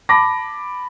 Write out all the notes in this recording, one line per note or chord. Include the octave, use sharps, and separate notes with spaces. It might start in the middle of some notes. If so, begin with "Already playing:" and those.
A5 B5 D6 A#6